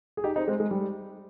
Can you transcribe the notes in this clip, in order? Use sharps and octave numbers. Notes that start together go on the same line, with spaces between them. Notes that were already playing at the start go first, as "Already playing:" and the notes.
G#4
D#4 G4
C4 D#4
G#3 C4
G#3
G3